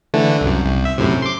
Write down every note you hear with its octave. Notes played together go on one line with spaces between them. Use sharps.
D3 E3 A3
C2 F#2
C2
E5
F#2 A2 C3
C6 D6